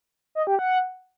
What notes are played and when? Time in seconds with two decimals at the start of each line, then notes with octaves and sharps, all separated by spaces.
0.35 D#5
0.47 G4
0.59 F#5